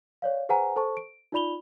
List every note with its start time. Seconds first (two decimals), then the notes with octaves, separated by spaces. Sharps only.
0.22 C#5 D5 F5
0.49 G#4 B4 C5 F#5 G#5 A#5
0.76 A4 C5 A5 C#6
0.97 D7
1.32 D#4 F4 D5 B5 F7 G7